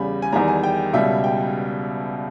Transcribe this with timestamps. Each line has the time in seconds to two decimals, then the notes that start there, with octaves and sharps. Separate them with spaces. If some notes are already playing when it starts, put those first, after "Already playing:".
Already playing: E2 C#3 G3 B5
0.22 G#5
0.33 E2 D#3 G3 A#5
0.48 G#5
0.63 G5
0.93 C#2 B2 G3 E5
1.24 G5